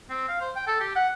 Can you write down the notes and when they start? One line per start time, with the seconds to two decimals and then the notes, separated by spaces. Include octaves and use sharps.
0.10 C4
0.28 F5
0.41 C5
0.56 G5
0.67 A4
0.80 G4
0.96 F#5